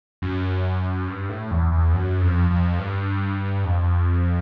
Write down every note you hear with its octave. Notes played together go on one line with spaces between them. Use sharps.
F#2
G2
A2
E2
E2
F#2
F2
F2
G2
F2